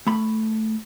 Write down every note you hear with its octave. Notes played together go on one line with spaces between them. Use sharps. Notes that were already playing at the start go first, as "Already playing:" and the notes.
A3 B5